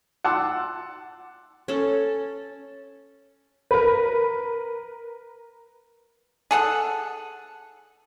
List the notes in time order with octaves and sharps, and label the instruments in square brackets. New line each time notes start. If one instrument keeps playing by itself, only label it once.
[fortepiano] F#5 A5 C6 D6 E6
[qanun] C#4 A4
[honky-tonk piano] A#4 B4
[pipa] G#4 A4 F#5